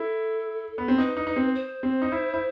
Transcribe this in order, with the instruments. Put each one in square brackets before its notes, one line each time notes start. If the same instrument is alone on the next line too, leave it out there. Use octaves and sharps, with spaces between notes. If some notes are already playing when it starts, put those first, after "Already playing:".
Already playing: [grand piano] E4 [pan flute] A4
[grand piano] B3
C4
[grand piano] D#4 [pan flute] B4
[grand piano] D#4
D#4
C4
[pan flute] C5
[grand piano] C4
D#4
E4
E4